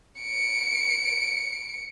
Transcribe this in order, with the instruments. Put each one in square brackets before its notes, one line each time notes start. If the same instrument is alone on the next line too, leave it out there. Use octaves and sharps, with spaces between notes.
[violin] C#7 D7